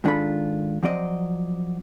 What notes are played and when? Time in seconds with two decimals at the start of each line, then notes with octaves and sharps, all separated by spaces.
0.04 G#2 D#3 D4 F4 A4 B5
0.83 F3 F#3 C4 D5 D#5